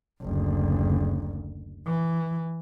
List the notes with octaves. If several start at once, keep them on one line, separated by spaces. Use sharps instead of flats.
F#1 D2
E3